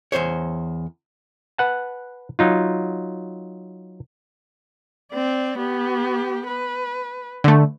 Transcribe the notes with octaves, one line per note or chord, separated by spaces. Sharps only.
E2 A#2 C5 C#5
B4 F#5 A5
F#3 D#4 F4
C4 D5
B3 G4
B4
D3 A3